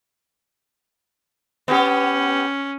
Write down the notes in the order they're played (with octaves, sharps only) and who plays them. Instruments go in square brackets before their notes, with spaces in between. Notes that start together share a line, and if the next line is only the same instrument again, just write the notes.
[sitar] B3 G4 [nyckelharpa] C#4